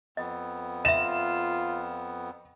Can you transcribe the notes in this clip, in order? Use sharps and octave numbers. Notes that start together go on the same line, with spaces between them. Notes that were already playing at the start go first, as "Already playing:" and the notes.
F2 B3 D#5
F4 D#5 E5 E7